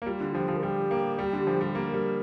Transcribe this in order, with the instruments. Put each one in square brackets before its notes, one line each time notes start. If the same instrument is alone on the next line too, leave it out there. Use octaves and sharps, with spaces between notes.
[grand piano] A#3
[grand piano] G3 [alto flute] F4
[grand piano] D3
[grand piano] F3 [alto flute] G4
[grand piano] F3
[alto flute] A#4
[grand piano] G3 [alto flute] G4
[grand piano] A#3
G3
D3
F3
G3
[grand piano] A#3 [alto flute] A#4
[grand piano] G3